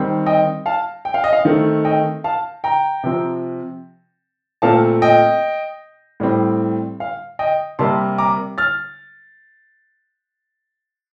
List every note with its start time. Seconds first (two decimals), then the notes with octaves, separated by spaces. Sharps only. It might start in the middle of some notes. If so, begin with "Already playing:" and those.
Already playing: D#3 G3 C4
0.26 D#5 G5
0.66 F5 A5
1.05 G5
1.14 F5
1.24 D#5
1.33 F5
1.45 D#3 A3 C4
1.85 D#5 G5
2.24 F5 A5
2.64 G5 A#5
3.04 C3 F3 C4
4.62 A#2 A3 C4 F5 A5
5.02 D#5 G5
6.20 A2 G3 C4
7.00 F5
7.39 D#5 G5
7.79 C3 G3 A#3 A5 C6
8.18 A#5 D6
8.58 F6 A6